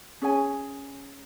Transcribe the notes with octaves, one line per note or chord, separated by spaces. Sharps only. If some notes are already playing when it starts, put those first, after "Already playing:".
C#4 G#4 C#5 G#5